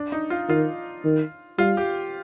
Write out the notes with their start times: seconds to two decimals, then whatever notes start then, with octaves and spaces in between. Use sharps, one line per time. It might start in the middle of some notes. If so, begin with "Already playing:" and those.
Already playing: D4
0.12 D#4
0.30 F4
0.49 D#3 F4
1.04 D#3
1.58 G3 F4
1.77 G4